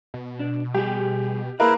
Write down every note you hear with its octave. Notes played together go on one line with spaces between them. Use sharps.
B2
D4
G3 G4 G#4
A#3 E4 G#4 A#4 B4 F5